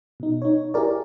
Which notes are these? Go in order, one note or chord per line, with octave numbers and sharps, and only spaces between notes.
B2 D#4
D#4 C#5
E4 G4 G#4 A#4 D5